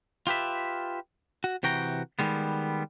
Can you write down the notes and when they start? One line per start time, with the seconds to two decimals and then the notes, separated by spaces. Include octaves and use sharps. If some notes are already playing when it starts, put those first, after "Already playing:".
0.27 F4 G4 B4 E5
1.44 F#4
1.63 C3 E3 F#4 G5 A#5
2.19 D#3 G3 G#3 B3